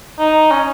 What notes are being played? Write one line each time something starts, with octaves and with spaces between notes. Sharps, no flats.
D#4
C#4